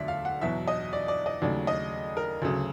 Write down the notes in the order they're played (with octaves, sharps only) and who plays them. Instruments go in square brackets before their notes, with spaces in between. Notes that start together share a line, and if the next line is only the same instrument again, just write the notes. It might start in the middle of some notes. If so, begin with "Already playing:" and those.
Already playing: [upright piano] E1 D2 D3 F#3 A3 D5 E5
F5
F#5
E2 B2 F#3 E5
D#5
D5
D5
D#5
D#2 C#3 F#3 A3 D5
D#5
A#4
D2 C#3 F#3 A4